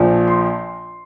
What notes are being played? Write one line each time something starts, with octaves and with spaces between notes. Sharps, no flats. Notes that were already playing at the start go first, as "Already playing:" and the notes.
Already playing: A#1 A#2 F3
C6